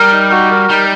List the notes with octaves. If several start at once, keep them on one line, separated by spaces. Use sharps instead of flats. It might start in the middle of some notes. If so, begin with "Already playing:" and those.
Already playing: G3 A#4
D#4
F#4
A#4
G3 D#4